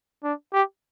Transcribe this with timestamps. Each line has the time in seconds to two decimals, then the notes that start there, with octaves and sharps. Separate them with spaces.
0.24 D4
0.53 G4